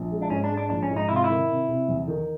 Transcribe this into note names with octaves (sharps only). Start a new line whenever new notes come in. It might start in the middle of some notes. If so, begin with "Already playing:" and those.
Already playing: A#1
G#3
D4
G#2 C#4
D4
G#3
D4
A#1 D4
C#4
G#2
D#4
C3 E4
F4
E4
D#3
C3
C3
E2
D#3